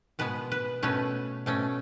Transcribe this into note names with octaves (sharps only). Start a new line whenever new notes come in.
B2 G#3 B3 B4
B4
B2 A3 C#4 B4
B2 A3 C#4